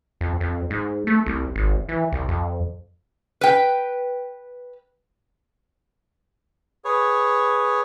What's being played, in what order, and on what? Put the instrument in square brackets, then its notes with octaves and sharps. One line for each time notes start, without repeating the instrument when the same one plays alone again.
[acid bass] F2
F2
G#2
A3
C2
G#1
E3
C2
F2
[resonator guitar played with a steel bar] B4 G5
[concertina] G#4 B4 C#5